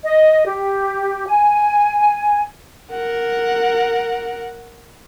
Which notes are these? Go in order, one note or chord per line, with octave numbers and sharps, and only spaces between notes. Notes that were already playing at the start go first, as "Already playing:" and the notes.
D#5
G4
G#5
A#4 F#5